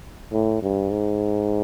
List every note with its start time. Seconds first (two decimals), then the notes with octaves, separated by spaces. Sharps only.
0.32 A2
0.62 G2
0.91 G#2